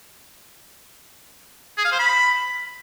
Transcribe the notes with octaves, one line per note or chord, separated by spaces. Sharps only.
G#4
F5
C5
B5